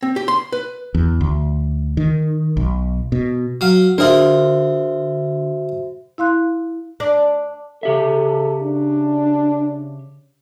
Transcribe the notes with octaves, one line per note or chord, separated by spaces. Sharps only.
C4
G4
C6
B4
E2
D2
D#3
B1
B2
F#3 F5
D3 F4 F#4 G#4 A#4 C5 E5
E4 F5 C6 F#6
D4
C#3 G4 A4 E5
D4